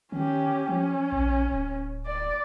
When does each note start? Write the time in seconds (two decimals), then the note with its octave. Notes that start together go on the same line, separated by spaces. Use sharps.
0.12 D#3 C#4 G4
0.68 F3 C#4
1.12 A#1
1.49 D1
2.06 D5